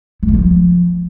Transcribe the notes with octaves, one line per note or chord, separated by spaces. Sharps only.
B3
A3
F3